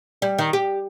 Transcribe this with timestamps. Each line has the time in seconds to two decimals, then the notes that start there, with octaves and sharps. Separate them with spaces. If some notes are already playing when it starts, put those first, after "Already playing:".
0.22 G3
0.38 D#3
0.53 G4